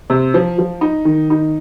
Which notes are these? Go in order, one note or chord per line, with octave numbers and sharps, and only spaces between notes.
C3
F3
F3
D#4
D#3
D#4